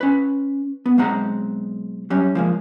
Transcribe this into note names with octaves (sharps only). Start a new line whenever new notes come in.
C#4 B4
B3
B1 G#3 C4 F#5 A#5
F#3 G3 C#4
F3 G#3 A#3